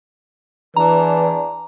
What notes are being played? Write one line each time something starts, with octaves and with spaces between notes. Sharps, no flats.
E2 E3 D4 B4 A#5